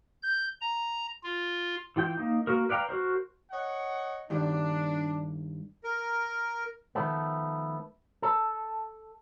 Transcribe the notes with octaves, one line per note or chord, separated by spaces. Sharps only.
G6
A#5
F4
E3 F4 G5 G6
A#3 D#4
A#3 F#4 A#4
B4 D5 F5 G5 A#5
F#4 A#4 C5
C#5 D#5 F#5
G2 D#3 D4
A#4
D#3 F3 A3 B3
A4